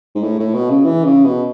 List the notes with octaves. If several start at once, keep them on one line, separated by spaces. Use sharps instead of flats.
G#2
A2
A2
B2
C#3
E3
C#3
B2